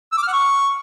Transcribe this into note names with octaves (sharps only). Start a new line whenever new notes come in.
E6
D6
F6
F#5
C#6